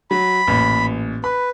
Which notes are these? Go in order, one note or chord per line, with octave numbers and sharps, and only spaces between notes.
F#3 B5
A1 A#2
B4 B5